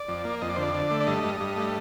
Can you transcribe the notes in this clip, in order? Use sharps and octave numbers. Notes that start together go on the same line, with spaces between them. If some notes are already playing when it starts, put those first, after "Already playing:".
Already playing: D5
F2
A#3
F2 D#5
D5
D3 C5
D5
D3
A3
D5
G2 D#5
G2
G2
A3